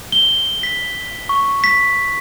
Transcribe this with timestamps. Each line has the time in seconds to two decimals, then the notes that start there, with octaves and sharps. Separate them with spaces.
0.12 G7
0.63 B6
1.29 C#6
1.64 B6